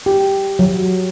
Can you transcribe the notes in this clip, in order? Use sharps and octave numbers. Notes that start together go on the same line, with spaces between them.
G4
F#3